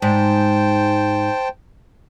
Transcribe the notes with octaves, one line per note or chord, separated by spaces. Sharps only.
G#2 C5 G5 A5